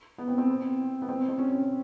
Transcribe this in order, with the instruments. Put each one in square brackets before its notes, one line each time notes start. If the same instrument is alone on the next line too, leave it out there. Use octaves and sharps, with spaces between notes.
[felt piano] B3
C4
C4
B3
C4
C4
C#4